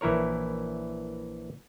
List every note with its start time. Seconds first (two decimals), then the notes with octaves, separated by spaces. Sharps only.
0.01 A#1 E3 E4 A#4 C#5